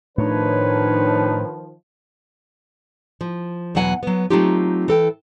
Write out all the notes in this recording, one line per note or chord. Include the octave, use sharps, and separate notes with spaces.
A2 D#3 F3 A3 D4 D#4 B4 C#5
F3
E2 B2 F#3 F#5 G#5
F#3 B3
F#3 A3 C4 D#4 F4 G4
E3 A4 G5